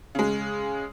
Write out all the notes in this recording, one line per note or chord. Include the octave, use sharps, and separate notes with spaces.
C#3 G#3